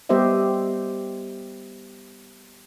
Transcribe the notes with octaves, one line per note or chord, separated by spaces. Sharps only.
G3 B3 G4 C5 D#5 E5